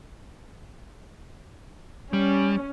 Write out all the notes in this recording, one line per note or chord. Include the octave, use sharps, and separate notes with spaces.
G3 C#4